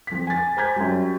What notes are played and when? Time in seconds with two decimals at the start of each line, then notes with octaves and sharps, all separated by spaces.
0.07 F2 B6
0.27 G#5 A6
0.57 C5 G#5 A#5 G6 G#6 B6
0.76 F#2 G3